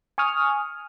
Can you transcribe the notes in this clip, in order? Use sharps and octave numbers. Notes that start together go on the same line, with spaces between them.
G#5 C#6 D#6 F6